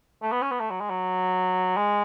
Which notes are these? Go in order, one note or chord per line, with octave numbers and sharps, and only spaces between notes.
A3
B3
C#4
B3
A3
F#3
G#3
F#3
G#3